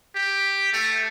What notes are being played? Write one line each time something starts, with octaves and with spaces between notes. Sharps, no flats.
G4
A3